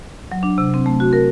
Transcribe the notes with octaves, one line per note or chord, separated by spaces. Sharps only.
F#3
D4
C3
C4
A3
F#4
A#4